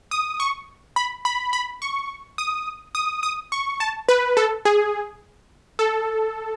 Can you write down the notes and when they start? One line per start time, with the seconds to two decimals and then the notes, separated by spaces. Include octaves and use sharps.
0.11 D#6
0.40 C#6
0.96 B5
1.25 B5
1.53 B5
1.82 C#6
2.38 D#6
2.95 D#6
3.23 D#6
3.52 C#6
3.80 A5
4.09 B4
4.37 A4
4.65 G#4
5.79 A4